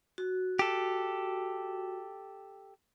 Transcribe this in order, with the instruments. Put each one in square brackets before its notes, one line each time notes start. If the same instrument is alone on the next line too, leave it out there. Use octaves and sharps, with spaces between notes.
[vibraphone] F#4
[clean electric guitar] G4 A4